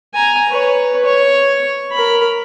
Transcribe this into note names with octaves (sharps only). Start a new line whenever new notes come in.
G#5 A#5
B4 C#5
C#5
A#4 B5